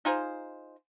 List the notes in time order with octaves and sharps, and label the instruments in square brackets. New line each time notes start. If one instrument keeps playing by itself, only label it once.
[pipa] D#4 F4 G#4 C5